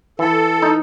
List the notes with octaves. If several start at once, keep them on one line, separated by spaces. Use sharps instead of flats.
E3 A4
D#4